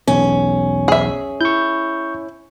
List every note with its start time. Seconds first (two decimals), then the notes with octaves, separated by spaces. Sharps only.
0.08 B1 E2 C#4
0.88 G#4 E5
1.41 E4 C#6 G6